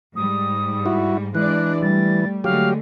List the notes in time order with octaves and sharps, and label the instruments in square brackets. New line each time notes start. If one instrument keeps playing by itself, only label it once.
[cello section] G#2 G3 [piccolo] D#6
[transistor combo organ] E4 F#4
[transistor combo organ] E3 [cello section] G#3 D4 D5 [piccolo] F#6
[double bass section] G3 [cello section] A3 [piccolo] A6
[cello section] D3 G#3 A3 [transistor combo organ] F#3 G4 [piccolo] F5